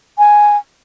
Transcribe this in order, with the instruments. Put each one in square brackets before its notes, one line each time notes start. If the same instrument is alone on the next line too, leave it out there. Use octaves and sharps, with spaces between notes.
[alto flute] G#5